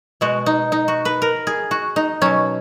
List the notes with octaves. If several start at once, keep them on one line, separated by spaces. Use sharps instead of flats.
B2 G#3 F#4
D#4
D#4
F#4
B4
A#4
G#4
F#4
D#4
B2 F#3 C#4